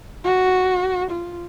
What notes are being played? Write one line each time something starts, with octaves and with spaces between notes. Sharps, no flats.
F#4
F4